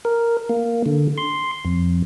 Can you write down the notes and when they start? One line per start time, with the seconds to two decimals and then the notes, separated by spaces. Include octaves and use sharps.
0.05 A#4
0.49 A#3
0.86 D3
1.18 C6
1.65 F2